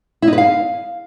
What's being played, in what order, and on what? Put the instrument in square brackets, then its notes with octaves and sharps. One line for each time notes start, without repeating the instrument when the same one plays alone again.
[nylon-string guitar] E4
D#4
B4
F5